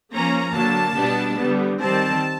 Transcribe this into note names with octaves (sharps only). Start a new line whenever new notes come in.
F3 A#3 C#4 A#5
D3 F#3 A#3 A5
B2 G3 B3 D4
D3 G3 B3
D#3 G3 C4 A5